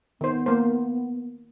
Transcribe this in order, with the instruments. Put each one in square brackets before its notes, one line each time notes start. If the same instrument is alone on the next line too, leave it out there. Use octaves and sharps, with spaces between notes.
[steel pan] D#3 C5 [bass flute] B3
[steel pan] A#3 C5